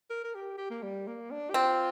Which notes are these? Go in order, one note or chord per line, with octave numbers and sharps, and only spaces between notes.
A#4
A#4
G4
G4
A#3
G3
A#3
D4
G4
C4 F4